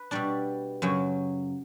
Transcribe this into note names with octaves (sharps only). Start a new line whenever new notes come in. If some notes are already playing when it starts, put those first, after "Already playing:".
Already playing: B4
B2 G3 D4 D5
F#2 C#3 F#3